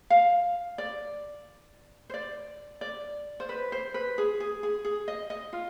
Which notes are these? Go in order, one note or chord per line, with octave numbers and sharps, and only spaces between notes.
F5
D5
C5
D5
D5
C5
B4
C5
B4
G#4
G#4
G#4
G#4
D#5
D#5
F4